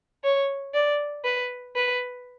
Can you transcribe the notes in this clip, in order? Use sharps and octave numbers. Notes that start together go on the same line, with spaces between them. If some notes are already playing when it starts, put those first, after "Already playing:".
C#5
D5
B4
B4